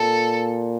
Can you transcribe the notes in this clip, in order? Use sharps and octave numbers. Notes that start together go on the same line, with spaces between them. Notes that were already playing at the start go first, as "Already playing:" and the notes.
Already playing: A#2 A4